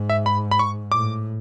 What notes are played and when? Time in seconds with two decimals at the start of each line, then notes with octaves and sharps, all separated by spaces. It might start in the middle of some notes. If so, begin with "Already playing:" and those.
Already playing: G#2
0.09 E5
0.26 B5
0.51 B5
0.59 C#6
0.92 A2 D6